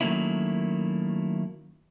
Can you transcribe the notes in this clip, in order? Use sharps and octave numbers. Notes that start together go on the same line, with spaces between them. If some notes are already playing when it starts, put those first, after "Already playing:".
D#3 F#3 A3 A#3 C#4 E4